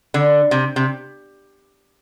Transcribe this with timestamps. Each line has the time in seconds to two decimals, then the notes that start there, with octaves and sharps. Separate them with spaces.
0.14 D3
0.51 C3
0.76 C3